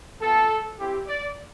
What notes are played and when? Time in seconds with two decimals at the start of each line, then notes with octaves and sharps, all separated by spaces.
0.20 B3 F4 A4
0.79 C4 E4 G4
1.07 D5